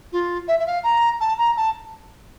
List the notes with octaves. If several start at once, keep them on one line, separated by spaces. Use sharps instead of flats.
F4
E5
E5
F5
A#5
A5
A#5
A5